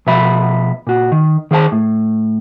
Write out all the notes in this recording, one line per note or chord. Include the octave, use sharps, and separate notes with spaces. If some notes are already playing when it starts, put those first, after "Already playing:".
B2 F3 E5 B5
A#2 F#4
D#3
D#3 G#4 C5 F5 A5
A2